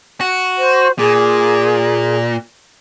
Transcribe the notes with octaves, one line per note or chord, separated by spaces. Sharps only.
F#4
C5
A#2 G#4